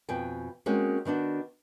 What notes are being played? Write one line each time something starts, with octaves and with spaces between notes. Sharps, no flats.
F2 B2 G5 G#5
G#3 A#3 C4 C#4 F#4 G#4
D#3 B3 D4 F#4